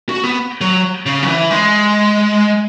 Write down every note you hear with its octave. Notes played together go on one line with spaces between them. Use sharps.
F#4
B3
F#3
C#3
F#3
E3
G#3